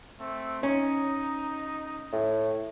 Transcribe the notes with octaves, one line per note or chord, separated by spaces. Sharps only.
A3 C4
C#4 D#4
A2